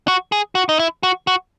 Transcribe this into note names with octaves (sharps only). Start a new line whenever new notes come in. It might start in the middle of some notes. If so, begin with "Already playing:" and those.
F#4
G#4
F#4
D#4
E4
F#4
F#4